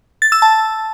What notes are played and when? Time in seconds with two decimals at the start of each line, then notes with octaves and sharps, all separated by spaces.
0.22 A6
0.32 E6
0.42 A5